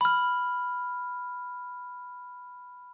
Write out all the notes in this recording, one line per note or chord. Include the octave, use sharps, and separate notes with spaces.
B5 F6